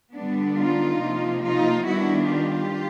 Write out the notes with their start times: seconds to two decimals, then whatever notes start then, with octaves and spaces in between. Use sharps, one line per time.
0.13 D3 G3 B3 D4
0.57 D#4 F4
0.99 C3 F3 A#3
1.42 D#4 F4
1.85 D#3 G3 B3 D4 E4 F#4
2.27 F4 G4